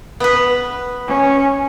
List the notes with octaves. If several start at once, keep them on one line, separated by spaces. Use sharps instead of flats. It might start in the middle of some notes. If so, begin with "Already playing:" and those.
B3 B4
C#4